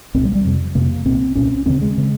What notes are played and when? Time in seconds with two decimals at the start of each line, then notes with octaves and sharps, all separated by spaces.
0.14 C2 A#2 C4
0.25 G3
0.35 G3
0.45 F2 C3
0.75 F2 C3 A#3
1.05 C2 A#2 C4
1.35 C2 A#2 C#4
1.66 D#2 C#3 C4
1.82 G#3
1.98 C#3